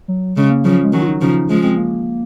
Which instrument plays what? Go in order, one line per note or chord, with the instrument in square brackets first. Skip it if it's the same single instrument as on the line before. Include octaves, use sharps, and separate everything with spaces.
[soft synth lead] F#3
[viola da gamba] C#3 [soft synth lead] G#3
[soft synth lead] A#3
[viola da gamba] C#3 F3 [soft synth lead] F#3
[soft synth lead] G#3
[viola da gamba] D#3 F#3 [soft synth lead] C#4
[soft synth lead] F4
D#4
[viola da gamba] C#3 F3 [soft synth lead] D#4
[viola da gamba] F3 G#3 [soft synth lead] C#4
[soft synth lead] C4
A#3